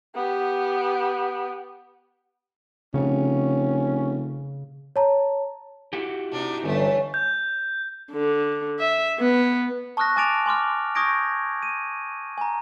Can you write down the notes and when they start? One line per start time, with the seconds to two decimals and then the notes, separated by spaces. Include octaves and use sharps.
0.15 B3 G4
2.94 F1 C#3 C#4
4.96 C#5 A5 A#5
5.93 E4 F#4 G4
6.32 C3 D4 D#4
6.64 G1 E3 A3 C#4
7.14 G6
8.11 D3
8.79 E5
9.19 B3
9.97 A5 C#6 D#6 F6 F#6 A#6
10.16 G#5 A5 D6 A6 D7 F7
10.46 G#5 C6 D6 F6
10.95 C#6 D#6 G6 G#6 A#6 D7
11.62 D#7
12.38 G#5 A#5